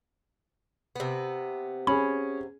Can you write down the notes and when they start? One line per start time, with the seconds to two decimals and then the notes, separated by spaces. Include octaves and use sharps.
0.96 C3 B3
1.87 C#4 G#4 B5